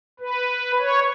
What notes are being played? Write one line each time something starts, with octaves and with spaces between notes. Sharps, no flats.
B4
C#5